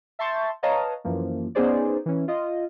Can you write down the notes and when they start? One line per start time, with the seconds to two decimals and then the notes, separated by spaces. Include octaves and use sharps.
0.19 E5 A5 C6 C#6 G6 A6
0.63 B4 C#5 D#5 F5 A5 A#5
1.04 F#2 E3 F3 A#3
1.55 B3 C#4 D#4 G#4 C5 D5
2.06 E3 C#4
2.28 F4 D#5